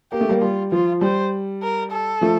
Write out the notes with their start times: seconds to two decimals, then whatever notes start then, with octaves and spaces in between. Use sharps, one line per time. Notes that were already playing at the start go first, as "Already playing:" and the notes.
0.12 A#3 G4
0.21 A3
0.29 G3 A#3
0.41 G3 F4
0.71 F3 F4
1.01 G3 C5
1.62 A#4
1.92 A4
2.21 F3 A3